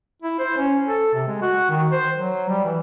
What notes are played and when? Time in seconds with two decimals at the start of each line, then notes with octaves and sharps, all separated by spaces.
0.22 E4
0.39 C5
0.57 C#4
0.87 A4
1.14 C3
1.28 G#3
1.42 F#4
1.70 D#3
1.92 C5
2.17 F#3
2.49 G3
2.65 E3